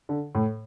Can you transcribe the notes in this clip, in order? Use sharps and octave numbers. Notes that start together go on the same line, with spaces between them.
D3
A2